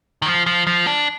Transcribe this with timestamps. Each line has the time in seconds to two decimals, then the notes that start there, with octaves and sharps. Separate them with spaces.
0.22 D#3
0.26 F3
0.46 F3
0.67 F3
0.87 D4